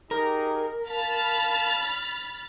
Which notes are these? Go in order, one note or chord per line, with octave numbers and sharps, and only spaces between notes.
D#4 G4 G#4 A#4
F5 A5 B5 F6 A6